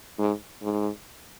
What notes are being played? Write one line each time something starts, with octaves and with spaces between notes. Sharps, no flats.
G#2
G#2